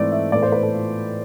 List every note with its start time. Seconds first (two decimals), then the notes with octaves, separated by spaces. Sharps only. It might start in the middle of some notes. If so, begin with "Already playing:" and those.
Already playing: G#2 E3 A3 C4 D5
0.12 E5
0.32 A2 E3 B3 D5
0.42 C5
0.52 B4
0.63 A4
0.73 F4